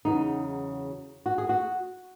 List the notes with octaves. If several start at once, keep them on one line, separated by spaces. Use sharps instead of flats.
E2 C#3 F#3 D#4
F#4
G#4
F#4